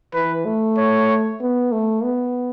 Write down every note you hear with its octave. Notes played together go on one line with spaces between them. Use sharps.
E3 B4
A3
C#5
B3
A3
B3